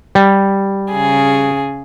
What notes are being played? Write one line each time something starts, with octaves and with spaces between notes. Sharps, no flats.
G3
C#3 G#4